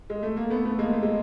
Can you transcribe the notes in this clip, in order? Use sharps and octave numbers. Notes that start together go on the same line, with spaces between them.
G#3
A3
A#3
A3 B3
A3 B3
G#3 A#3
A3
G#3